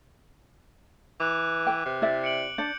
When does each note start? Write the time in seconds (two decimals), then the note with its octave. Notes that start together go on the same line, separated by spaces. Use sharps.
1.20 E3 D6 F#6
1.67 B4 G5
1.86 C3
2.02 E4 D5 E5
2.24 C#7 D7 F#7
2.58 D4 D5 G6 C#7